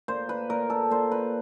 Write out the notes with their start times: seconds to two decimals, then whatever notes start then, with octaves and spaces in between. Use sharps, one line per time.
0.08 A#2 C5
0.29 B4
0.50 A#2 A#4
0.70 A4
0.90 A#2 C5
1.12 B4